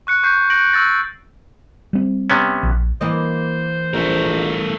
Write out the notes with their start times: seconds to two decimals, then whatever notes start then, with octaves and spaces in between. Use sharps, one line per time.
0.07 C#6 F#6 C#7
0.23 C#6 G6 C7
0.50 C#6 G6 A#6 D7 F#7
0.73 C#6 E6 G6 A6 A#6
1.93 G3 C4
2.30 C3 B3 C#4
2.63 A#1
3.01 E3 A#3 C5 D#5
3.94 A#1 A3 A#4